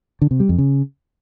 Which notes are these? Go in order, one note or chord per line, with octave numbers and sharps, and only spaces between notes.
D3
C3
G3
F2
C#3